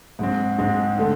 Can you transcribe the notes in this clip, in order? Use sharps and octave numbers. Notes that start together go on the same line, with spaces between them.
G#2 G#3 C4
G#2 G#3 C4
D3 A3